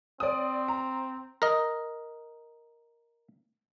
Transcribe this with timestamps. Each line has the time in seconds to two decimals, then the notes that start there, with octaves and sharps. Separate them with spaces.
0.20 C4 D5 D#6
0.68 A#5
1.42 A#4 D#5